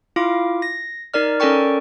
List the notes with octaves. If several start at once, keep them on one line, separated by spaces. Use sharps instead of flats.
E4 F4 F5 D6
A#6
D#4 A#4 D5 F6
C#4 A4 A#4 D5 G5 C#6